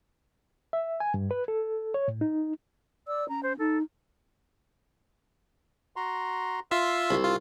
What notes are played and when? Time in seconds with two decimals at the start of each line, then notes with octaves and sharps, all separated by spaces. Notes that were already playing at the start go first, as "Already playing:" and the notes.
0.73 E5
1.00 G#5
1.14 G2
1.31 B4
1.48 A4
1.94 C#5
2.08 A2
2.21 D#4
3.07 D5 E6
3.29 C#4 A#5
3.43 C5
3.59 D#4 A4
5.96 F#4 A#5 C6
6.71 F4 E5 C6 E6
7.10 C2
7.24 F4